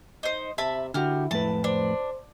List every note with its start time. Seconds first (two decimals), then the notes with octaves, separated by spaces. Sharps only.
0.23 D#4 C5
0.58 C3 E5 A5 B5
0.94 D3 E4 F#4 G4 F6
1.31 F2 A2 B4 A5
1.64 D4 C5